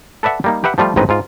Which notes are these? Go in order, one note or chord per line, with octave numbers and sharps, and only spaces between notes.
A4 B4 D5 E5 F#5
G3 A#3 D#4
G4 B4 E5 F#5
F3 G3 A3 F4
A1 G#2 D#3 C4 B4 D#5
G#2 F4